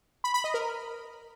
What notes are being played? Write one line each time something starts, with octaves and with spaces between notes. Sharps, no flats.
B5
B5
D#5
A#4